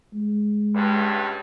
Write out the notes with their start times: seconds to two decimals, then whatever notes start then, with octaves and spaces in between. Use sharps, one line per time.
0.14 G#3
0.73 C#2 G2